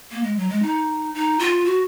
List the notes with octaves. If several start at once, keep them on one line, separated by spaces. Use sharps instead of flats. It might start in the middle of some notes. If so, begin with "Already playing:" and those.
A#3
G#3
F#3
G#3
D#4
D#4
F4
F#4